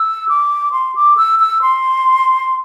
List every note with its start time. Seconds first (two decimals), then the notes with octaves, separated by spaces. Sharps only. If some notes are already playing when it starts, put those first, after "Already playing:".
Already playing: E6
0.29 D6
0.72 C6
0.95 D6
1.17 E6
1.40 E6
1.62 C6